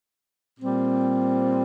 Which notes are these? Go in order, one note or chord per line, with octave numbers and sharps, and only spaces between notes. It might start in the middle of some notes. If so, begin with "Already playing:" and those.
A#2 G3 C4